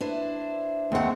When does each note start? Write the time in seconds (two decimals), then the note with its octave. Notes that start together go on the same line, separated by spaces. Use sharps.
0.01 D4 E4 B4 C5
0.92 D#2 G#3 A3 C4 F#5